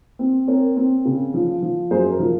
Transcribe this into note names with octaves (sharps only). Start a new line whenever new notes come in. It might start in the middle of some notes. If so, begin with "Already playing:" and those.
C4
C4 A#4 C#5
C4
C#3
F3
F3
F#2 G#4 C5
A#4
F3